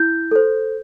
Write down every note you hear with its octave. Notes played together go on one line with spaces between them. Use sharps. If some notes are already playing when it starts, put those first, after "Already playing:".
Already playing: E4 G6
A4 C5